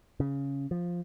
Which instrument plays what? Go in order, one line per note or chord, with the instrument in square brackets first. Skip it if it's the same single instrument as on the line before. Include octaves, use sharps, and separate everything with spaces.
[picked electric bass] C#3
F3